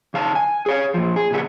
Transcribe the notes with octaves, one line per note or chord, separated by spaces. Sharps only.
C#3 F5 A5
G#5
G#4 C#5 F5
A#2 F3
G#4
A#2 C#3 F4 E5 F#5